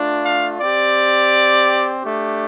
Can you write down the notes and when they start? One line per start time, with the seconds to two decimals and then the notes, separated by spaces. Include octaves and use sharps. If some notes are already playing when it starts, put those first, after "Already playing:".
Already playing: A3 D4 F4
0.24 F5
0.60 C4 G4 D5
2.03 A3 D4 G4